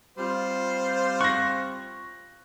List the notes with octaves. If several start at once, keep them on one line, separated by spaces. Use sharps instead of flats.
G3 C4 F4 C5
C#6 F#6 A#6